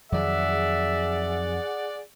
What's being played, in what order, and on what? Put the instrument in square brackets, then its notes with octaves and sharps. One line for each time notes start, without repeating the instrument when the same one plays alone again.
[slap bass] F2 D#3 F#3 [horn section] G#4 D5 F#5 [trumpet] E5